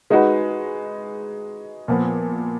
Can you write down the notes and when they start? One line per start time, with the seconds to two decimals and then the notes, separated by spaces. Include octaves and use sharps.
0.10 G#3 D#4 F#4 B4
1.88 A#2 F3 B3